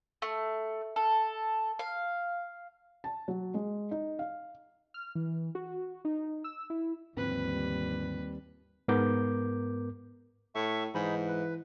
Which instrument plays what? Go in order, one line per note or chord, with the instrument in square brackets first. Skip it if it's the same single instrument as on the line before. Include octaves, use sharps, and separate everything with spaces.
[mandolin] A3
A4
F5
[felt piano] A5
F#3
G#3
D#4
F5
[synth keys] F6
E3
F#4
D#4
E6
E4
[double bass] D#2 G3 [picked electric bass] G#2 D3 F3 [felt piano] C4 [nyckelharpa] B4
[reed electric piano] G#2 B3 A#4 D6 G6
[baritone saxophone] A2 [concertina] E5 C#6
[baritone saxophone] G#2 [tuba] E3 [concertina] D#4 G#4 B5
[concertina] B4